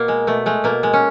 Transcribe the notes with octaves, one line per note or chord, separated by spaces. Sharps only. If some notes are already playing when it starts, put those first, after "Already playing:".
Already playing: B2 A#3
G#3
B2 A3
G#3 A3
B2 A#3
G#3
C#4